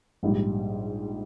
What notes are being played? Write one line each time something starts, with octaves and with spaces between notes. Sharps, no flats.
A#1 G#2 G3